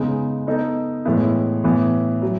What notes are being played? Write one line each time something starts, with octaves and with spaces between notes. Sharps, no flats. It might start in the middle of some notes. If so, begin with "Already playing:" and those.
Already playing: C#3 G#3 B3 D#4
B3 D#4 A4
A2 E3 G#3 B3 E4
A2 E3 B3
F#3